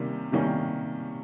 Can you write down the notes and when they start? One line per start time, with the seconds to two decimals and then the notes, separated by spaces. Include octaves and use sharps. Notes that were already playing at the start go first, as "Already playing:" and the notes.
Already playing: C3 D#3 G3 A#3 C#4
0.32 C3 D#3 G3 A#3 C#4